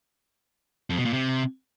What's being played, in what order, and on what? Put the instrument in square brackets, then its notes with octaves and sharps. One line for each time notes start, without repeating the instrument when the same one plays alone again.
[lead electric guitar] F2
B2
A#2
C3